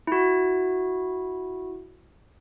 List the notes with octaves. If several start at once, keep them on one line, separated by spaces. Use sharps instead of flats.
E4 F#4